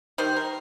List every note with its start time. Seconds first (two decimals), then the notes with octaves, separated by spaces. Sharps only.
0.18 D#3 G3 C5
0.36 A#4